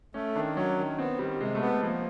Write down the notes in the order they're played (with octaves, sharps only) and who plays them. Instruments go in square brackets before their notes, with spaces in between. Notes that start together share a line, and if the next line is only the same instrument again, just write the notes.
[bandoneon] A3 [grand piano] C#4
[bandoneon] D#3 [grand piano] D4
[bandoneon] F#3 [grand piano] C#4
[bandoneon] D#3
[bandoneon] B3 [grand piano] C4
[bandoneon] D#3 [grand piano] G3
[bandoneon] C3 [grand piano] G#3
[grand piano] A3
[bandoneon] B3
[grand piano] A3
[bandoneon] F3 [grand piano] A#3